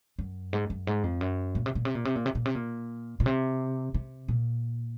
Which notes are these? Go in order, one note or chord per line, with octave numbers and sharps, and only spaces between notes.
F#2
G#2
F#2
G#2
F2
F#2
A#2
C3
A#2
C3
A#2
C3
A#2
C3
A#2
C3
A#2
A#2
C3
C3
A#2